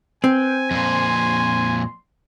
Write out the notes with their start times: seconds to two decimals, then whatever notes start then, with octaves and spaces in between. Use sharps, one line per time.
0.24 C4 B4 G5 G#5
0.71 F2 A#2 C6